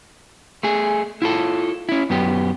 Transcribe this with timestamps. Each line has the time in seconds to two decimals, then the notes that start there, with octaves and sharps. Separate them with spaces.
0.63 A3 G#4
1.22 E4 F4 A4
1.89 C#4 E4
2.10 F#2 B3 G4